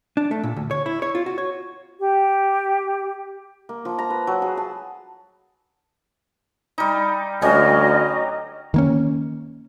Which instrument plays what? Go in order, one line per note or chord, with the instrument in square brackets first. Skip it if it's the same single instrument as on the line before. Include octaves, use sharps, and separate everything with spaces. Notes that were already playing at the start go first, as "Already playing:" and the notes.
[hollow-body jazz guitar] D4
A3
A#2
D2
C#5
E4
C#5
F4
F#4
C#5
[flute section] G4
[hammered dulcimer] A#3
F3
A#5
B4
F#3
G#4
A5
G3 D#4
[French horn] D2 [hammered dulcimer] F#3 G3 C#4 [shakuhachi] D#5
[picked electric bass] D#3 A#3 C#4